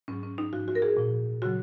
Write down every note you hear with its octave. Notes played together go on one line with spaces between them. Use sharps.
G#2 F#3 C#4
C#4
D#4
G#2 F3 F#4
F#4
A#4
G#4
A#2 F3
C#3 F#3 F#4